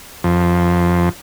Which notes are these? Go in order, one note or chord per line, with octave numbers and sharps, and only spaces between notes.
F2